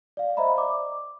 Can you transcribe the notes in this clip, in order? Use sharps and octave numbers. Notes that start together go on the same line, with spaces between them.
D5 F5
C5 D#5 E5 A#5 B5
D5 D6